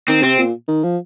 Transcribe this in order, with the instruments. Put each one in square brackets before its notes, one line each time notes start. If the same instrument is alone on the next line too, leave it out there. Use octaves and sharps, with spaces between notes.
[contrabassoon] D#3 [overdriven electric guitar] C4
[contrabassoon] C3 [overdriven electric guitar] C4
[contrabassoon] A#2
D#3
F3